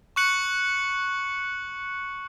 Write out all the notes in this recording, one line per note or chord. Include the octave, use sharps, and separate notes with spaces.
C#6 F#6 C#7 F#7